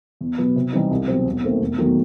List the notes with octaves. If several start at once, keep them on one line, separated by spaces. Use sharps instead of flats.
E2
B2 F#3 B3
C3
E3 G3 C4 D#4
C2
B2 F#3 C4
E1
D#2 D#3 A3 C4
E1
E2 D#3 F#3 A3